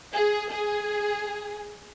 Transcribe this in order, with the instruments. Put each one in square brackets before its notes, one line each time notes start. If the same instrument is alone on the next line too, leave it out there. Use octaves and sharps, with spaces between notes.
[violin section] G#4
G#4